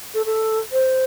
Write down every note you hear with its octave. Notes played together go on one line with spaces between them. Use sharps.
A4
A4
C5